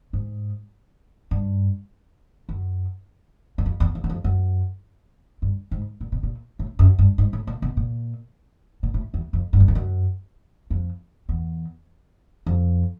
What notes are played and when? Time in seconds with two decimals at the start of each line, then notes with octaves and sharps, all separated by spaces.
0.13 G#2
1.31 G2
2.49 F#2
3.58 F#2
3.66 F2
3.80 E2
3.95 F2
4.04 F#2
4.09 F2
4.24 F#2
5.42 G2
5.71 G#2
6.01 A#2
6.12 B2
6.23 A#2
6.59 A2
6.79 F#2
6.99 G2
7.18 G#2
7.33 A2
7.47 A#2
7.62 B2
7.77 A#2
8.83 A#2
8.94 A2
9.14 E2
9.33 F2
9.53 G2
9.60 F#2
9.68 F2
9.75 F#2
10.70 F2
11.29 E2
12.46 F2